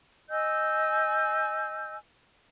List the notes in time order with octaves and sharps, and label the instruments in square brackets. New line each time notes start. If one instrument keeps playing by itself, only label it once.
[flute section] D#5 G#5 E6 G6